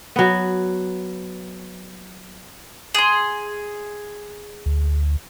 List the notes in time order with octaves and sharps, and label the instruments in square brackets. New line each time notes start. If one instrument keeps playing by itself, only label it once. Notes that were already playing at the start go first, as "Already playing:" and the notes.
[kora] F#3 B3
[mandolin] G#4 C6
[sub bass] D2